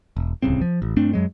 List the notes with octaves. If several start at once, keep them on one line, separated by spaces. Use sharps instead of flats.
E1
D1 C2 C#3 C4
F3
A1
G2 A3 C4 D4
F#2 F#3 G#3